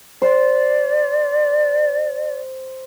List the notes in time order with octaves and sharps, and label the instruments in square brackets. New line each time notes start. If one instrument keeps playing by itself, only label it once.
[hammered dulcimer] C5 [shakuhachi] D5